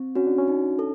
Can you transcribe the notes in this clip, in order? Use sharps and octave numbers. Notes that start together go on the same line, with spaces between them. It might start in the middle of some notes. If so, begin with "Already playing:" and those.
Already playing: C4
C#4 F#4
D4
C#4
D#4
A4